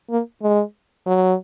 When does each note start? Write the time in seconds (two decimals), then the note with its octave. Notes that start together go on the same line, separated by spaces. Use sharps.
0.10 A#3
0.42 G#3
1.06 F#3